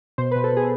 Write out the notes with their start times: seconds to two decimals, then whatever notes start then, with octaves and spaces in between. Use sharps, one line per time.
0.18 B2 C5
0.31 B2 B4
0.44 A4
0.52 B2 G#4